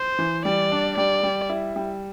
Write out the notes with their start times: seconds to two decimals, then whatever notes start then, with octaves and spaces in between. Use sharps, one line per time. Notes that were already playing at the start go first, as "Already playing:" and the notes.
Already playing: C5
0.19 E3
0.45 G3 D5
0.72 D4
0.97 G3 D5
1.23 G3
1.50 E4
1.76 G3